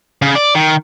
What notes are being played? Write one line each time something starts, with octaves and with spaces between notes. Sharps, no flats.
C#3
D5
D#3